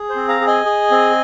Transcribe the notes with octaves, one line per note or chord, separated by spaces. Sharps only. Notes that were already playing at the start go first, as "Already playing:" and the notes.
Already playing: G#4
C5
C4
F5 A#5
G#4
D#5 G#5
G#4
C4